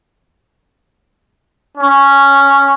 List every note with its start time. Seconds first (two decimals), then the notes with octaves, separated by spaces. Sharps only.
1.77 C#4